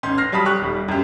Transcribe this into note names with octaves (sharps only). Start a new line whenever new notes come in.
A1 C#4 C6 G6
F6 A#6 C7
F#3 G3 A5 B5 D#6 B6
G4 C#6 F#6
D#1 G3
F#2 G4